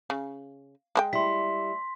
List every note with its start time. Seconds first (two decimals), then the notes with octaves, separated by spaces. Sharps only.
0.10 C#3
0.95 G#3 C5 G5
1.13 G3 E4 C6 B6